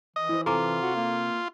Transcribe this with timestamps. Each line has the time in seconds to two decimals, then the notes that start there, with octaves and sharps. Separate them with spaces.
0.16 E3 D#5
0.29 E4 C5
0.46 C3 F4 A4 C5 G#5 A#5 D6
0.82 F#4
0.95 A#3